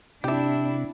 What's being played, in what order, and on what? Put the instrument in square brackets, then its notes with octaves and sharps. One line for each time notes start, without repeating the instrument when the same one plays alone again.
[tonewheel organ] C3 [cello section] D4 E4 [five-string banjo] G4 E5